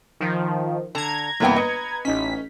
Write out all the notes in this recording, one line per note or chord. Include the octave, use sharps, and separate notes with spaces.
D#3 F3
D3 A5 A#5 G#6
G1 C3 E3 A#3 B3 G5
B4 D#5 C#7
A1 C#4 D#4 B6